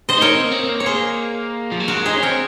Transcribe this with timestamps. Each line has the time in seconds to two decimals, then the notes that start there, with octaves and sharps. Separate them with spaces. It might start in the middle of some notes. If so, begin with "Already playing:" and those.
0.09 C5 D#5
0.18 D#4 A#4 C#5
0.35 C4
0.45 A#3
0.51 C4
0.64 C4
0.69 A#3
0.80 C#5
0.86 G#4 C5
1.72 F3
1.80 F#3
1.88 G#3 F#4 A#4
2.06 D#4 G#4 C5
2.15 C#4
2.23 C4 A#4 C#5